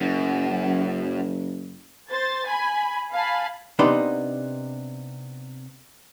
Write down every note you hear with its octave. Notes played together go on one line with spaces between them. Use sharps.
F#1 F#2
C5 A6
G#5 B5
F5 G#5 A5 B5
C3 B3 D4 D#4 B5 C6